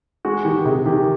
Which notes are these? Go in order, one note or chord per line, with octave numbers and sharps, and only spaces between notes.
G#3 F#4
D#3 G4
C3 G#4
D#3 G4